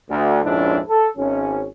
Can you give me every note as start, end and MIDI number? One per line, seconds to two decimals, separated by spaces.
0.10 0.39 38
0.44 0.79 34
0.44 0.79 41
0.44 0.79 44
0.44 0.79 61
0.44 0.79 62
0.44 0.79 64
0.89 1.08 69
1.17 1.66 32
1.17 1.66 61